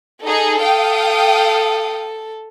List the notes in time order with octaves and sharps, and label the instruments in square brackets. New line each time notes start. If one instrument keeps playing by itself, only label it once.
[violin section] D#4 G#4 [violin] A4
[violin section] F5 G5 D#6